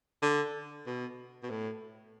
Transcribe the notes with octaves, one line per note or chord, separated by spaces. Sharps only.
D3
B2
B2
A2